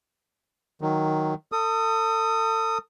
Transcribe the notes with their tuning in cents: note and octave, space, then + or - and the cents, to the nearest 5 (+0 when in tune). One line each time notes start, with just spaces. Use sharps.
D#3 +5 F#3 +0
A4 +35 D#6 +0